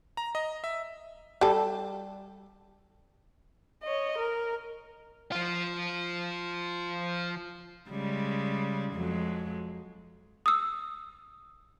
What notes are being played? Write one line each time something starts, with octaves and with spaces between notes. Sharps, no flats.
A#5
D#5
E5
G3 A4
C#5 D#5
A#4
F3 F4
C#3 G3 G#3
F2 F#3 G#3
D#6 E6